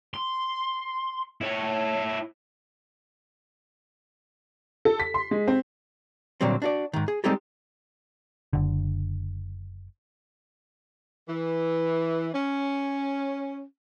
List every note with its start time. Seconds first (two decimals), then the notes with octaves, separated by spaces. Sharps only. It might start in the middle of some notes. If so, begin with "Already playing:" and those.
0.14 C6
1.41 E4 C#5
4.85 A4
5.00 B6
5.14 C6
5.31 G#3
5.48 C4
6.41 A#2 D3 F#3 G3 C4
6.62 D4 F#4 D5
6.93 G#2 D#3
7.08 G#4
7.24 G3 G#3 C4 D#4 G4 A4
8.53 F#1 D3
11.28 E3
12.34 C#4